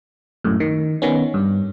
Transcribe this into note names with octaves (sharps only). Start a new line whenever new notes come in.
F#2 A2
D#3
D#3 B3 C#4
G2